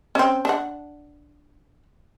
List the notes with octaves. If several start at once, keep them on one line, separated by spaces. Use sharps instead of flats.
C4 C#4
D4 F#5